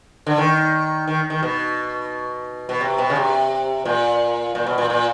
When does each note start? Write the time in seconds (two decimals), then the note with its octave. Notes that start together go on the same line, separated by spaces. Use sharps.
0.27 D3
0.38 D#3
1.08 D#3
1.30 D#3
1.43 B2
2.69 B2
2.81 C3
2.98 B2
3.10 C#3
3.16 C3
3.85 A#2
4.55 A#2
4.66 B2
4.78 A#2
4.90 A#2